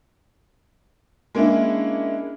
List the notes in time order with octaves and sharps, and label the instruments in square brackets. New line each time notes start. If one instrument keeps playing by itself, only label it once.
[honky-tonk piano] G#3 A#3 C#4 D4 E4